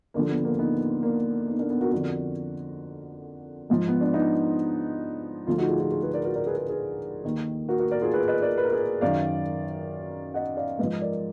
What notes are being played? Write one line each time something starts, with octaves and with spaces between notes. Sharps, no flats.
D#2 D3 F3 A#3 D4
B3
A#3 D4
B3 D#4
A#3 D4
B3 D#4
A#3 D4
B3
F#4 A#4
F2 D3 F3 F#4 A#4
G#2 F3
B3
D4
B3 D#4
D2 D3 F3 D4 F4
D#4 F#4
F4 G#4
F4 G#4
F4 G#4
G#4 B4
A#4 D5
B4
F#4 A#4
A#4 D5
G#4 B4
G#4 B4
G#4 B4
D#2 D#3
F#4 A#4
F#4 A#4
A#4 D5
F4 G#4
G#4 B4
B4 D#5
A#4 D5
B4
A#4
G#4 B4
F#2 D#3 D5 F5
D#5 F#5
D5 F5
G#2 F3 B4 D#5
A#4 D5